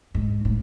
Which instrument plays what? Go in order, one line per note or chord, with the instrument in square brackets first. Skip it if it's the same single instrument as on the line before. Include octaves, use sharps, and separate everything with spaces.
[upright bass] G#2
A2